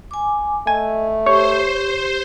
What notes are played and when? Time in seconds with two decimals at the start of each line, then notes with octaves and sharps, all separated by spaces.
0.11 G#5 D6
0.67 A3 D#5 G#5
1.26 G4 C5 C#5